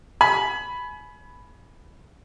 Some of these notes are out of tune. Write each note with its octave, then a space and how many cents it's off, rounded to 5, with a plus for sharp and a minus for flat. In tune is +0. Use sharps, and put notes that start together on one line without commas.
G#5 +30 B5 +0